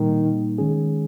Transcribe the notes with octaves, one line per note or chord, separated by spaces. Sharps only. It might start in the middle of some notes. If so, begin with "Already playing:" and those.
Already playing: A#2 D#3 G3 A#3 D#4
D#3 G#3 C#4 G#4